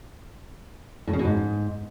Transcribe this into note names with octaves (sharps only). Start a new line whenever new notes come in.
A2
C#3
B2
G#2